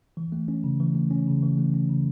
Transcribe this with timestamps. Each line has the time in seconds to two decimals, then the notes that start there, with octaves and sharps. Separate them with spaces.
0.17 E3
0.32 A3
0.48 C#4
0.64 C#3
0.80 E3
0.95 A3
1.11 C#4
1.27 C#3
1.42 E3
1.58 A3
1.74 C#4
1.89 C#3